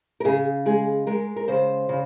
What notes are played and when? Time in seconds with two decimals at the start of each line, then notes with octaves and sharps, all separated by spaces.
0.20 A#4
0.25 C#3 G#4
0.66 G#3 G#4
1.07 G#3 A#4
1.36 A#4
1.48 C#3 C5
1.89 C#3